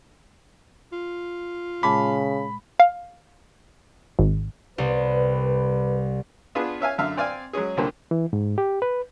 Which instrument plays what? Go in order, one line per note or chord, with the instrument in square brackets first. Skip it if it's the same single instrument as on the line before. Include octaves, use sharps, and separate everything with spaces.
[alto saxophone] F4
[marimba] A#2 G#3 A5 [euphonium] C#3 [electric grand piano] B5
[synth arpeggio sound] F5
G#1
[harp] C2 G3 [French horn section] B4
[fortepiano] B3 D4 F4 G#4
C#4 E5 F5 G#5
F#2 D3 E5 F5
C4 D5 F5 G#5
F#3 G#3 C#4 G#4
C2 A#2 D3 A#3 G4 C5
[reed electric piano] E3
G#2
G4
B4